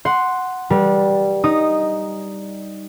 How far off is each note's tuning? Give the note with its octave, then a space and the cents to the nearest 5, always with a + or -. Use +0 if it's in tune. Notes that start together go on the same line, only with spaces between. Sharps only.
F#5 +0 C6 +0
G3 +0 B4 -35
D#4 +0 D#6 -15